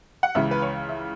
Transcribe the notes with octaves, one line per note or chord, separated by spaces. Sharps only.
F#5
C#2 C#3 E3 E5
B4
C#5
E5